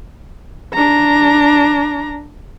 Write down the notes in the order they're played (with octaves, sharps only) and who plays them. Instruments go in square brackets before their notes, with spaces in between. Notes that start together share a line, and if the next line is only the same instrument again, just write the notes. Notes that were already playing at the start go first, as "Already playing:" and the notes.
[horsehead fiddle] D4 A#5